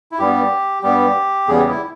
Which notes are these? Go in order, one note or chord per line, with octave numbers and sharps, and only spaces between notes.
E4
G2 G3 B3 G4
G2 G3 B3 G4
E2 C#3 G3 B3 G#4
G4
E4